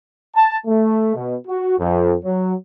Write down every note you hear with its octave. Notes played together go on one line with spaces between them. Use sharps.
A5
A3
B2
F#4
F2
F#3